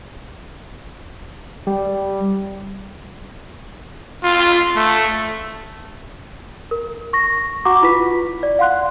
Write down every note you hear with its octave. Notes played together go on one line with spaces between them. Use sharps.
G3
F4
A3
A#4
C#6 A#6
F#4 F#5 A#5 C#6 D6
E4 F4 B4 B6
D5
F5 F#5 C6 F#6